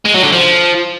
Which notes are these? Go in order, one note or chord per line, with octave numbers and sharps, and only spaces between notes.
G#3
F#3
D3
F3